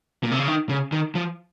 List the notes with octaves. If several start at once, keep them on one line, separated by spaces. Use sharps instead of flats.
A#2
C3
C#3
D#3
C#3
D#3
F3